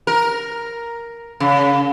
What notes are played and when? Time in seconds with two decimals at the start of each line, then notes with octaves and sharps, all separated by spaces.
0.07 A#4
1.40 C#3